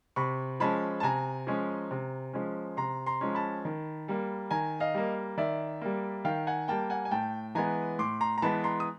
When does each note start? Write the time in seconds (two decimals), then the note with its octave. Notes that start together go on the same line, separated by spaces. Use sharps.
0.16 C3 B5 C#6
0.60 F3 G#3 C#4 A5 B5
1.00 A5
1.03 C3 G#5 A#5
1.47 F3 G#3 C#4
1.91 C3
2.33 F3 G#3 C#4
2.77 C3 A#5 C6
3.06 A#5 C6
3.21 F3 G#3 C#4
3.35 A5 B5
3.65 D#3
4.08 G3 A#3
4.51 D#3 G#5 A#5
4.80 D#5 F5
4.94 G3 A#3
5.37 D#3 D5 E5
5.81 G3 A#3
6.25 D#3 F5 G5
6.47 F#5 G#5
6.68 G3 A#3 G5 A5
6.90 F#5 G#5
7.05 G#5
7.11 A2 G5 A5
7.55 E3 G#3 B3 G#5 A#5
7.99 A2 C6 D6
8.21 A#5 C6
8.38 A#5
8.42 E3 G#3 B3 A5 B5
8.64 A#5 C6
8.80 D#6